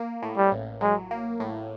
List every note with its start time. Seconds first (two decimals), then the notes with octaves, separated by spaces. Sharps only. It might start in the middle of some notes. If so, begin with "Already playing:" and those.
Already playing: A#3
0.22 A2
0.37 G3
0.52 A1
0.81 F#3 G#3
1.11 A#3
1.40 A2